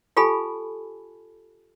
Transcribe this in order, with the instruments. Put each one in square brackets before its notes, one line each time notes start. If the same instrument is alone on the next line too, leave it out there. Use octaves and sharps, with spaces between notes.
[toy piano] F4 G4 A4 G#5 A5 B5